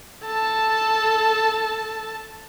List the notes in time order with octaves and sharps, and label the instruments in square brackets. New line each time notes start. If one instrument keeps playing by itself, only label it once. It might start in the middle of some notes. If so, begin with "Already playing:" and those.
[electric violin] A4 A5